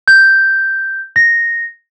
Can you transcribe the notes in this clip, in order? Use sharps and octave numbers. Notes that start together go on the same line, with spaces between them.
G6
A#6